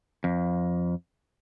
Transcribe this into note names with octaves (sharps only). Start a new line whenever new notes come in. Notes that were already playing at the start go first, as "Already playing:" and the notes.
F2